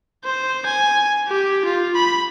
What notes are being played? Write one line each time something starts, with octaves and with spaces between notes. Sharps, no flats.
C5
G#5
G4
F4
B5